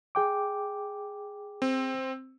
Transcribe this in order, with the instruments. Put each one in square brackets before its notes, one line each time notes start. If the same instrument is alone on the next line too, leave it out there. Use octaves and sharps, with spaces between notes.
[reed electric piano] G#4 G5 D6
[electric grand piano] C4